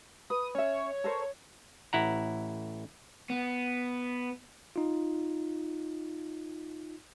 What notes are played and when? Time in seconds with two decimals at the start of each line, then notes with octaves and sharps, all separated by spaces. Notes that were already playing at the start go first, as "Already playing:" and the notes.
0.30 B4 D#6
0.55 C#4 C#5 E5
1.04 A4 A#4 C5
1.93 A1 E4 F#5 A#5
3.30 B3
4.76 D#4 F4